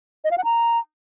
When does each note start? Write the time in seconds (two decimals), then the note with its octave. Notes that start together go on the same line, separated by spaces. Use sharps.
0.24 D#5
0.31 F5
0.38 F#5
0.44 A#5